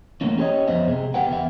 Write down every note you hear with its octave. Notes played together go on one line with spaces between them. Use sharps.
E3 F#3 A3 A#3 C#4
C#4 G4 G#4 C5 C#5 D#5
F2 B3 C5 D#5 E5
C3 G#3
B3 G4 B4 F#5 G5
E2 B3 E5